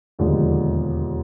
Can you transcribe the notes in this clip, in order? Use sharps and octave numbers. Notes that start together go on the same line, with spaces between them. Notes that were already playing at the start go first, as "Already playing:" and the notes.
E1 D#2 D3 F3 G#3